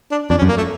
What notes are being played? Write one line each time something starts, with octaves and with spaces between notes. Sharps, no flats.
D4
F2 D4
C#4
F#2
A#3
A3